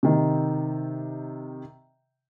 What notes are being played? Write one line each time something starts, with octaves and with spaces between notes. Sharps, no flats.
C3 D#3